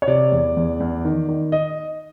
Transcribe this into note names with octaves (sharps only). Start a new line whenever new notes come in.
C#5
C3 D5
E2
E2
E2
D#3
D#3
D#5